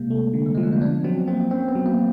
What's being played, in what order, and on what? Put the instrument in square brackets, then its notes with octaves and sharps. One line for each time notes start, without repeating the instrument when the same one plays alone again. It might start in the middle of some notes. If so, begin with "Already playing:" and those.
Already playing: [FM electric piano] C3 [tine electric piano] G#3 A#3
[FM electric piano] A3
D3
[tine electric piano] G3
[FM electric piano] F3 [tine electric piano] G#3
[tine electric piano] A3
A#3
[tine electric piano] B3 [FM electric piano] D4
[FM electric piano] F#3 [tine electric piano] C4
[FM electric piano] A#3 [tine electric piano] C4
[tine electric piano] C4 [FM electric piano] C#4
[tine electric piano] B3
[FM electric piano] F#3
[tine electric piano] A#3